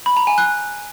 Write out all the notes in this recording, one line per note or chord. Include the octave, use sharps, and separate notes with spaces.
B5
A#5
G#5
F#6